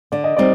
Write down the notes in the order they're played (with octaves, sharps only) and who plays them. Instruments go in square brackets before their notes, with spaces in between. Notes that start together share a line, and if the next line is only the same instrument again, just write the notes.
[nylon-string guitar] D3 [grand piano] D5
[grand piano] D#5
[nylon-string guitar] G3 C4 D#4 [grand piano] D5